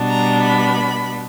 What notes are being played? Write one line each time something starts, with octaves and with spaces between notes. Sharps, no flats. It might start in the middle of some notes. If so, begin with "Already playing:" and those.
Already playing: B2 G3 B3 D4
A#5
B5